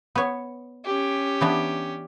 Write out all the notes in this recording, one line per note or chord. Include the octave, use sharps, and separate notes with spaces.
B3 C#5
C#4 G4
E3 B3 D4